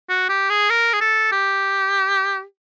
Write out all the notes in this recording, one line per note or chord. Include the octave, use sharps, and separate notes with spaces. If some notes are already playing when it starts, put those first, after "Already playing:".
F#4
G4
G#4
A#4
G#4
A4
G4